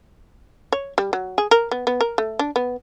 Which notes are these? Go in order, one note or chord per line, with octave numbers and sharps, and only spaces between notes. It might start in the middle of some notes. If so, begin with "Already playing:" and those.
C#5
G3
F#3
G#4
A#4
B3
B3
A#4
A3
D4
B3